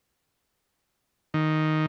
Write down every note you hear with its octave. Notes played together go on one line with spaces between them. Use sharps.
D#3